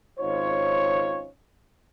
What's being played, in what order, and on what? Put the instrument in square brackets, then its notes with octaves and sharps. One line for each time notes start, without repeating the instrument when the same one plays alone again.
[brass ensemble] G#1 C#4 D#4 F4 C5 C#5